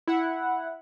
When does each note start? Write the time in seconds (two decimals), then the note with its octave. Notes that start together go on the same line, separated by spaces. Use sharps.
0.07 E4 F#5